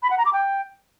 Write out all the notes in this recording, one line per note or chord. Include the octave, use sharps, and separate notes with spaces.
B5
F#5
A#5
D6
G5